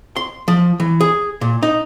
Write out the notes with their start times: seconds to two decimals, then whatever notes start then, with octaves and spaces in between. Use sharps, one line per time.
0.16 C6
0.48 F3
0.80 E3
1.01 G#4
1.41 A#2
1.63 D#4